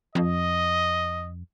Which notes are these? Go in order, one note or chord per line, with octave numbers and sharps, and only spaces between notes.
F2 D#5